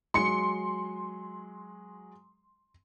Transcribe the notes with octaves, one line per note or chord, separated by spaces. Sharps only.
F#3 G#3 C6 C#7